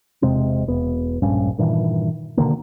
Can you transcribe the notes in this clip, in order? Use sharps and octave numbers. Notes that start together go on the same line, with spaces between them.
E1 C3 G#3 C4
E1 B3
E1 A#1 G2 C#4
G2 A#2 D#3 E3
B2 D3 D#3 A#3